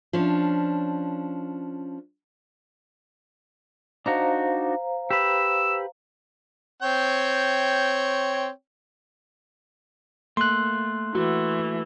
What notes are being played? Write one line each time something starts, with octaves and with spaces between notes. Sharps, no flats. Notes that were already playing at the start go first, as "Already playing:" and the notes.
F3 C#4 D4
D4 D#4 F#4 C5 F5 A#5
G4 B4 E6
C4 C#5 G5
A3 A#3 C6 F#6
E3 A3 F#4